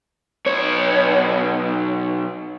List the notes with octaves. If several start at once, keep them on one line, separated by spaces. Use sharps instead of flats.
B1 C#5